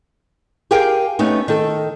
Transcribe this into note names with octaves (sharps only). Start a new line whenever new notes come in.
G4 G#4 A#4 F5 G5 G#5
A3 B3 C#4 D#4
D#3 A4